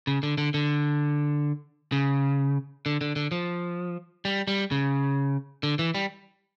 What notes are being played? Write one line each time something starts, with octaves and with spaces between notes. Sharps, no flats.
C#3
D3
D3
D3
C#3
D3
D3
D3
F3
G3
G3
C#3
D3
E3
G3